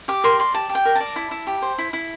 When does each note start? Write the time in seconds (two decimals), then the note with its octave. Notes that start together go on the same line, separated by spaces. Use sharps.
0.08 G4 D6
0.24 A#4 C6
0.39 D5 C6
0.54 G4 A5
0.69 G4
0.75 G5
0.85 A#4
0.95 D5 A5
1.16 E4
1.31 E4
1.47 G4
1.62 C5
1.78 E4
1.93 E4